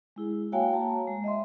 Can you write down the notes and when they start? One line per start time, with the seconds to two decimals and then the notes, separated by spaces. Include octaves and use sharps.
0.16 G#3 E4 G#4
0.52 A#3 F#4 C#5 F5 G5 G#5
0.73 A5 A#5
1.07 G#3
1.24 D#5 E5 C6